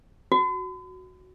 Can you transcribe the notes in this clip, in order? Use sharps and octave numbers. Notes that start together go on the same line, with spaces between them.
F#4